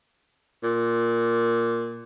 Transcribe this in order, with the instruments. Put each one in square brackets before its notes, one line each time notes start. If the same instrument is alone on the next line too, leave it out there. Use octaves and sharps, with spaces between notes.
[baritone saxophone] A#2